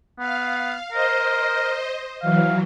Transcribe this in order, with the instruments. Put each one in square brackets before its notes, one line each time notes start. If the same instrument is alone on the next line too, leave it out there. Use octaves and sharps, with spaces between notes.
[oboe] B3 [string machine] F5
[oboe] A#4 [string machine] C5 D#5
[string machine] E3 F#3 [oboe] F5